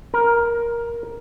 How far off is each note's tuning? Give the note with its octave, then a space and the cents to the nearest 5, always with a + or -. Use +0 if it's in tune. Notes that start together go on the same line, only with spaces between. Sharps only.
A#4 +10